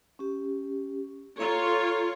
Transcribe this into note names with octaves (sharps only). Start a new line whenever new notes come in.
C#4 G4
F4 A4 C#5 A#5